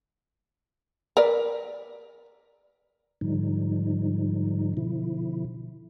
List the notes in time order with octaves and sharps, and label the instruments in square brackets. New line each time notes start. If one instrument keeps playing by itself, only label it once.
[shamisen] A#4 B4 D5
[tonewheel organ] G#2 D3 F3 G3 D#4
B2 D3 F3 E4